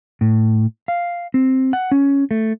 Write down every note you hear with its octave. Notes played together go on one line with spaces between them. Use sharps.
A2
F5
C4
F#5
C#4
A3